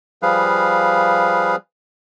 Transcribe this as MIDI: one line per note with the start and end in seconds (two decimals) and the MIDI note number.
0.22 1.56 53
0.22 1.56 55
0.22 1.56 68
0.22 1.56 71
0.22 1.56 77